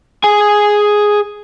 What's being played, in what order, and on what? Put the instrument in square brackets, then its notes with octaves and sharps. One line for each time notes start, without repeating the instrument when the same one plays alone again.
[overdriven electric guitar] G#4 G#5